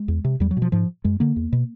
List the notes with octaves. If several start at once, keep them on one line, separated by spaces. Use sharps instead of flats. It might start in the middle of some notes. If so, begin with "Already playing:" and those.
Already playing: G#3
E2
C3
E2 G3
F#3
B2
F3
G#2 F3
F#2 G#3
D3 A#3
E2
B2